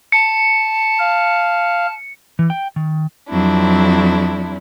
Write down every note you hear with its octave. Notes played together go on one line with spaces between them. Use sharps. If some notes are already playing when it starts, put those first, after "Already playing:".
A5 C#7
F5
E3
G5
D#3
F2 F#3 C4 D4 E4